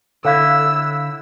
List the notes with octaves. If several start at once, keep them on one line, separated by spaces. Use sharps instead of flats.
D3 E4 A4 C#5 F5 E6